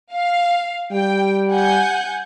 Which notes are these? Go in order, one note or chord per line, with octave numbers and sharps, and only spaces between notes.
F5
G3 G5
F#5 G#5 G6